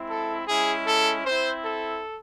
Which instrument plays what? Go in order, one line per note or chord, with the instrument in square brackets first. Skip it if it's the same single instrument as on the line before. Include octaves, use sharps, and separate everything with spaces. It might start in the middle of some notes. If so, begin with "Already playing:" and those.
Already playing: [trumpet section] G#3 C4 E4
A4
G#3 C#4 E4 G#4
A4
C4 E4 C5
A4